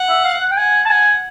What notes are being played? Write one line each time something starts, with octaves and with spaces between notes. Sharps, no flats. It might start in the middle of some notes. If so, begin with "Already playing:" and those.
Already playing: F#5
E5
F5
F#5
G5
F#5 G#5
A5
F#5 G#5